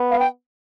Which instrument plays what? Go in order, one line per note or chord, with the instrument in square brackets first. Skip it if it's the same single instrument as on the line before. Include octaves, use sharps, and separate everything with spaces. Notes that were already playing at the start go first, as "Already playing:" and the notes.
Already playing: [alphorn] B3
[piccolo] F5
G5